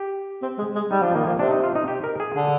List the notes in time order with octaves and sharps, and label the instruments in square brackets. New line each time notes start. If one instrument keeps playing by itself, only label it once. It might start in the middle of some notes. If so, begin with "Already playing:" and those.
Already playing: [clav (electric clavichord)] G4
[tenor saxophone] C4
G#3
G#3
[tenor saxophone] G3 [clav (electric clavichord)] D#4
[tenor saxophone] F3 [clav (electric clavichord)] D4
[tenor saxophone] D#3 [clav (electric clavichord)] A#3
[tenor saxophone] F3 [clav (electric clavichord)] A#3
[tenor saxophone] C3 [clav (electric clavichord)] D4
[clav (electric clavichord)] D#4
F4
D#4
G4
A#4
G#4
[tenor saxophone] D3 [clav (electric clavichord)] G#4